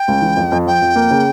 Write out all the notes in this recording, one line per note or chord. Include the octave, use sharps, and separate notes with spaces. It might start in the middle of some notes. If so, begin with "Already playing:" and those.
Already playing: G5
C#2
E3
F2
F2
F3 G5
F2
A#3
C#3